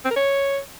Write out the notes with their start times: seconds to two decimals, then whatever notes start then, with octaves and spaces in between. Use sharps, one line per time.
0.05 C4
0.10 A#4
0.16 C#5